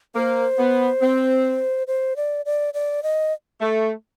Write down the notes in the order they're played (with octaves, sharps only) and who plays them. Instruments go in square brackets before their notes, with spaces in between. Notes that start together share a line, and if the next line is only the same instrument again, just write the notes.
[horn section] A#3 [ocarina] C5
[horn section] B3
C4
[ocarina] C5
D5
D5
D5
D#5
[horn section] A3